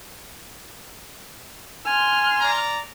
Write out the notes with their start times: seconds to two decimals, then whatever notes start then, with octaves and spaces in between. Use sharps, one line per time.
1.86 G#5 C6 F6
2.39 D5 A#5